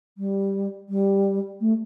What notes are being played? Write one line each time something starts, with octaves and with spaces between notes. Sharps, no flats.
G3
G3
A3